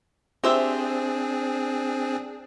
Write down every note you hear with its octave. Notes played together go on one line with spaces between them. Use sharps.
C4 D4 G4 G#4 C5 E5